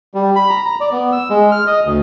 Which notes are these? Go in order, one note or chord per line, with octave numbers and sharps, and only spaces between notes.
G3
B5
A#5
A#5
D5
B3
E6
G#3
F6
D#5
D2